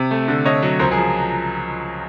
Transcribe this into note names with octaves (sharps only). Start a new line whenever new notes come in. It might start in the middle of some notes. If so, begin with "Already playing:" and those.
Already playing: C3
A3
D3
D3 C#5 D#5
F#3
C#2 A#4 C5
G#4 A#4
F3